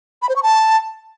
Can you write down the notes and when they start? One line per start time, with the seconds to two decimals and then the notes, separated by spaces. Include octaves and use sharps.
0.22 B5
0.29 C5
0.36 C#6
0.43 A5